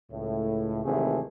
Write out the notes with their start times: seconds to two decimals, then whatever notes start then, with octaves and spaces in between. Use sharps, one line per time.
0.10 C#2 A2
0.84 G#1 D#2 C3 E3 A3 G#4